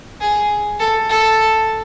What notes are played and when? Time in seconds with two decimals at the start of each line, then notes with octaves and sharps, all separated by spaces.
0.21 G#4
0.80 A4
1.09 A4